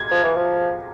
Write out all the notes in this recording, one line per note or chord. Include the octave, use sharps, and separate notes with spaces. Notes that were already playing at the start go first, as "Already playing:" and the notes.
Already playing: G#6
F3
E3
F3